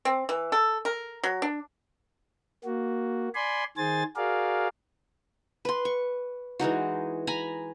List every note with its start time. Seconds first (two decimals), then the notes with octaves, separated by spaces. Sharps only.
0.05 C4
0.29 E3
0.52 A4
0.85 A#4
1.23 F#3
1.42 D4
2.65 A#3 F#4
3.35 D5 G#5 B5 C6
3.77 D#3 G#4 C5 G#5 A6
4.16 F#4 G#4 A#4 D5 F5
5.65 B4 C6
5.85 C#6
6.59 E3 G#3 D#4 F#4
7.27 G#5 A#5 B5